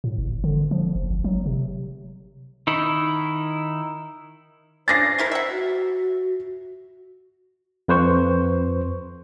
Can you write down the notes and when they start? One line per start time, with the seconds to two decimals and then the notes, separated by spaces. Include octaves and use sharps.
0.04 A2
0.18 G1
0.44 D3
0.71 F3
0.95 F#1
1.10 G1
1.24 F#3
1.46 C3
2.67 D#3 D#4 E4
4.88 C#4 D4 G#4 C5 A6 A#6 C7
5.18 A3 E4 A#4
5.31 E5 F#5
5.50 F#4
7.88 F2 B4 C5 C#6